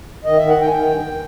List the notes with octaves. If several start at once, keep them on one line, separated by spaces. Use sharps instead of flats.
D#3 D#5
D#3 E5
F#5
D#3 G5
G#5
D#3 G5
G2